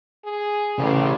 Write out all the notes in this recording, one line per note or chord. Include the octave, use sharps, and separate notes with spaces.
G#4
A1 C#3 G3